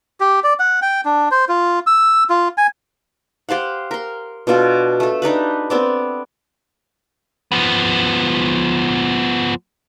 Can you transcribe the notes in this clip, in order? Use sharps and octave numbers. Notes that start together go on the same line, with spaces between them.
G4
D5
F#5
G5
D4
C5
F4
E6
F4
G#5
G4 C5 F5 F#5
A#4 C6
B2 D4 F4 A4
A3 A4
D4 D#4 G4 B4
B3 C4 D5
F3 B3